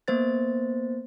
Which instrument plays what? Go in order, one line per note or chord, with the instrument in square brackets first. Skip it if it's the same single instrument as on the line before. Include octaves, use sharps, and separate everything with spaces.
[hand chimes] A#3 B3 C5 A6